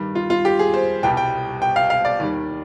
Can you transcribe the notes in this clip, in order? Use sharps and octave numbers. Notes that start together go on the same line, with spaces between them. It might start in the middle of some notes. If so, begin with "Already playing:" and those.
Already playing: G2 D#3 G3
F4
F4
G4
G#4
C5
C2 B2 G3 G5
G5
G5
F5
F5
D5
D#2 D#3 G3